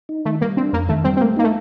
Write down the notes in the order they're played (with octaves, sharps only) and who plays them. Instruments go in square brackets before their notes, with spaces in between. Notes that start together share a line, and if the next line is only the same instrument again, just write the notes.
[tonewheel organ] D#4
[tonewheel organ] D#3 [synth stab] A3
[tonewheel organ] G3 [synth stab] A#3
[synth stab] C4 [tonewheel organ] D4
[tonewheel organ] F2 [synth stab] A#3
[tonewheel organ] D#3 [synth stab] A3
[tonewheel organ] G3 [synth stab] C4
[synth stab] C4
[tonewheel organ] A3 [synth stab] A#3
[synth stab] A#3 [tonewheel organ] D#4
[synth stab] A3